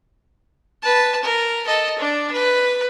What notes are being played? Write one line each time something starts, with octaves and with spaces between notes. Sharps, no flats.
B4 A5
A#4
A4 D#5
D4 D5
B4